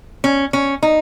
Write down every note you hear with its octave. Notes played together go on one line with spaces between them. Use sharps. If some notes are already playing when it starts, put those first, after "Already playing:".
C#4
C#4
D#4